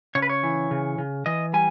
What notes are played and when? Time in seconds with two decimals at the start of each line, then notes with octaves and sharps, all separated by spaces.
0.15 C#3 C#5
0.22 B4
0.29 C#5
0.43 E3
0.71 C#3
0.98 C#3
1.26 E3 D#5
1.53 G3 G#5